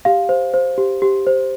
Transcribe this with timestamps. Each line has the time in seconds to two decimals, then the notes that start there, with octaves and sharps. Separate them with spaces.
0.05 G4 F5
0.29 C5
0.54 C5
0.78 G4
1.02 G4
1.27 C5